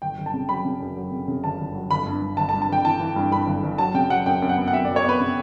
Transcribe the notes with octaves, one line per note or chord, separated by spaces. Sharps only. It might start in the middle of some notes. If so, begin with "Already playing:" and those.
G1 G5
G1
A5
C#3
F#3 B5
C#3
F#2
F#3
C#3
C#3
G1 A5
G1
F#3
G1 B5
G2
G2
G1 A5
A5
G2
A5
G1 G5
E3 A5
E3
G2
G2 B5
G1
G1
F#3 A5
C#3 G5
F#3 F#5
F#2 G5
F#2
F#5
B3
F#5
F#2 E5
D5
F#3
C#5
B3 B4
C#3